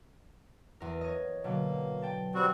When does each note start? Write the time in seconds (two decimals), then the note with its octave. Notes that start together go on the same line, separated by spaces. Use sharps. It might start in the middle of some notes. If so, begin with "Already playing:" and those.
0.80 E2 A#4
1.01 C#5 D#5
1.44 B2 D3 F#3 A#3
2.02 G5 A5
2.34 G3 C4 F#4